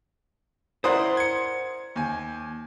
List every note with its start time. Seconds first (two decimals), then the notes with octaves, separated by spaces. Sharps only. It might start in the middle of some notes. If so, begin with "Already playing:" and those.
0.84 E4 A#4 C5 D5 F#5 C6 D#6
1.17 G#6 C#7
1.96 D#2 G#5